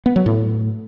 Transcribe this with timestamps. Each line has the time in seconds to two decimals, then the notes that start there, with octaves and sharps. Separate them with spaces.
0.06 B3
0.16 F#3
0.26 A2